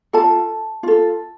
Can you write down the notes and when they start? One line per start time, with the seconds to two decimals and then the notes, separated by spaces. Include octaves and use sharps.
0.13 F4 A4 A5
0.83 F4 A4